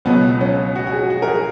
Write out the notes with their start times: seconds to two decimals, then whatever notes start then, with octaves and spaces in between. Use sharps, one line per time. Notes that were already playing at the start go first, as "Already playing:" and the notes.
0.05 C#2 B2 F#3 B3
0.41 C#4
0.75 F#4
0.87 F#4
0.92 G#4
1.10 F#4
1.22 A#4
1.28 G#4